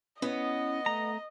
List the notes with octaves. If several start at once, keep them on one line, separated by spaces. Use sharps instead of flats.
B3 C#4 E4 C#5 D#5
A3 A#5